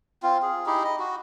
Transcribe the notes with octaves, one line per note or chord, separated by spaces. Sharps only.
C4 F4
G#4
D#4 E4 G4 G#4
D#5
F#4